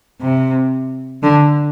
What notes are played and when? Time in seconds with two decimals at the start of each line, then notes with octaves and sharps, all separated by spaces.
0.21 C3
1.23 D3